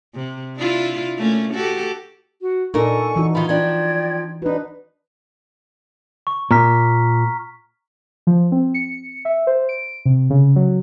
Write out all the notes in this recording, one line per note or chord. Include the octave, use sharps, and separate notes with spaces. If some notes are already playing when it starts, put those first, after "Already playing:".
C3
D4 E4 F4
A3 A#3 C#4
F#4 G4 A4
F#4
A#2 D4 D#4 A4 A#4 G#5 C#6
E3 D#4 F#4
D#3 F3 B5
F3 D4 D5 G5 G#6
D4 D#4 F#4 B4
C#6
A#2 A#5 F6 B6
F3
C4
C#7
E5
C5
D7
C3
C#3
F#3